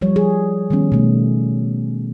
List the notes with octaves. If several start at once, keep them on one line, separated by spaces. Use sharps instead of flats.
F3 G3 C#5
G#4
D#3 G3 B3 C#4
B2 A3